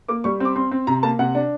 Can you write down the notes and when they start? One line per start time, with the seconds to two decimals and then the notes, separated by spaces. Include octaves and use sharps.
0.09 A#3 D6
0.24 G3 C#6
0.40 C4 D6
0.56 C4 C6
0.71 C4
0.87 C3 A#5
1.03 A#3 A5
1.19 C3 F#5
1.35 D4